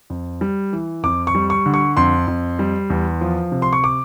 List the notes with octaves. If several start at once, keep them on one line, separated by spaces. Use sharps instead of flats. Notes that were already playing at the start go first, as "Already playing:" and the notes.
F2
G3
E3
F2 D6
C#6
G3
C#6
D3
C#6
F2 C6
F2
G3
E2
F3
C3
C6
C#6
D6